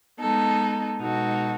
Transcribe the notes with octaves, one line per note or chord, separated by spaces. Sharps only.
G#3 B3 D#4 A4
B2 G#3 D#4 F#4 A4